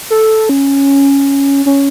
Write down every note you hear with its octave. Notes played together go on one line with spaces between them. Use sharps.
A4
C#4
C#4